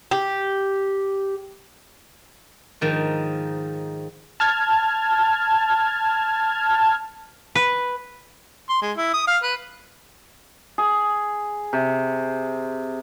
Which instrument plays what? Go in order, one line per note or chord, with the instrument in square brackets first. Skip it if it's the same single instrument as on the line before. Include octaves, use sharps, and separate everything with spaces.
[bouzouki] G4
[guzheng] G#2 D#3 F3
[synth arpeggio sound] A5 F6 G#6
[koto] B4
[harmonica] C6
G#3
E4
D#6
F5
B4
[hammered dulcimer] G#4
C3